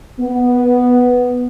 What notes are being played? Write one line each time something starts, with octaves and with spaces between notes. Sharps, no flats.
B3